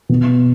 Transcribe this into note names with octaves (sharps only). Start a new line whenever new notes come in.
B2